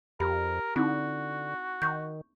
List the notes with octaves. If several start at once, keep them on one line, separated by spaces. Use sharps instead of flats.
F2 G4 A#4 B5
D3 C4 D#4 E4 F#4
D#3 C#6 G6